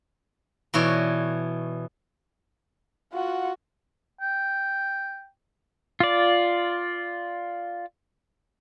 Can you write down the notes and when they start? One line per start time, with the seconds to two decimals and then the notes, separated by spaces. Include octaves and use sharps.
0.74 B2 E3 C#5 D5
3.13 F4 F#4 F#5
4.21 G5
6.00 F4 D5